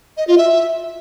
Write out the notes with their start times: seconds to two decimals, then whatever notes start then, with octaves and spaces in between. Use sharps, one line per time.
0.17 D#5
0.28 F4
0.38 E5